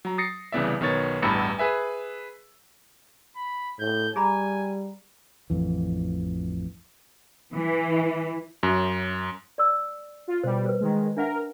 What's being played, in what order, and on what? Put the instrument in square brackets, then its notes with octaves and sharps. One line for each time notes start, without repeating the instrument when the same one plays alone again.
[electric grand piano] F#3 A#5
D#6 A6 A#6 C7 C#7
C2 C#3 E3 B3 D5 E5
B1 D#3 B3 C#5 A6
A1 E2 G2 B5 E6 C#7
G#4 B4 E5 G#5
[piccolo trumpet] B5
[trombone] A2 [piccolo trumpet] G6
[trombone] G3 [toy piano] G#4 A#5 B5 [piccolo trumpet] G#5
[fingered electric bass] A1 F2 E3
[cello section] E3
[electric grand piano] F#2
[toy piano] D5 E6
[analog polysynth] F4
[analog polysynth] B2 G3 [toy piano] C5
[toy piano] B4 C5
[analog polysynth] D#3 G#3
[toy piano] D4 E5 F#5 [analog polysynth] A#4